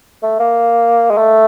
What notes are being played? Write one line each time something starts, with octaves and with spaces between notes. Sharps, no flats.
A3
A#3
G#3
A3